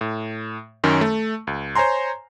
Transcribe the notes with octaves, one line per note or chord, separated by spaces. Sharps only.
A2
F#2 D#3 C#4
A3
C#2
C5 C#5 G#5 A#5 C6